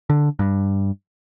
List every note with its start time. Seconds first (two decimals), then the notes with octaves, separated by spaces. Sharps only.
0.10 D3
0.39 G2